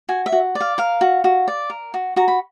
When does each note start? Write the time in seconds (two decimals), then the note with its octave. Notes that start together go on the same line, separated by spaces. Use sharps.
0.09 F#4 G#5
0.26 E5
0.32 F#4
0.55 D5
0.61 F5
0.78 A#4 F5
1.01 F#4
1.24 F#4
1.48 D5
1.70 A#4
1.94 F#4
2.16 F#4 A#5
2.28 B5